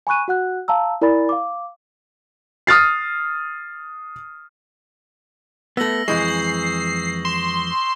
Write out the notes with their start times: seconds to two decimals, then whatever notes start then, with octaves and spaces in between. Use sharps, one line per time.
0.07 G#5 B5 C#6 F#6 D#7
0.28 F#4 F#5 F#6
0.68 F5 A5 A#5 E6
1.01 E4 A#4 D5 G#5 B5 A6
1.29 F5 D6
2.67 D#6 F6 A6 C7
5.77 A3 B3 E6 A#6 F#7
6.08 F2 E3 G#3 C#6 D#6 G6 C7
6.28 F#7
7.25 C6 E7